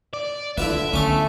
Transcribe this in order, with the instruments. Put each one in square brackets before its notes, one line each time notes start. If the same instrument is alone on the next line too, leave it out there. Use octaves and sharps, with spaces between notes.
[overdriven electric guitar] D5
[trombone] D3 [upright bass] D4 [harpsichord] E4 F4 B4 [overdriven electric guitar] E5
[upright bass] D3 B3 [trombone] A3 [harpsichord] C#4 D6